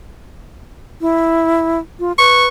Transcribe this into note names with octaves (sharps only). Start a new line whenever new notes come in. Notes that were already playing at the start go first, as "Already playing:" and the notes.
E4
F4
B4 C#6